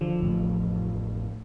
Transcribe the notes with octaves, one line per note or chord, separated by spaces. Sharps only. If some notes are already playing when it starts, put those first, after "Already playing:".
D3 F3
A1 F2 A2